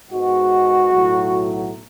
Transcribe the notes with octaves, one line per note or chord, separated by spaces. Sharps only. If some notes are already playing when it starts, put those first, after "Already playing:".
G#2 G#3 B3 F#4
B1 A2 F#3